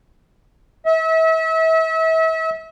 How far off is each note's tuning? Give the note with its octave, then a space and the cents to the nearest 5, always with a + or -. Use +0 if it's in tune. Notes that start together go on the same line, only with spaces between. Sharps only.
E5 -35